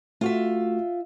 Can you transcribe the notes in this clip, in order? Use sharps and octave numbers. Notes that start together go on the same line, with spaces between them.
A3 F4 F#4 E5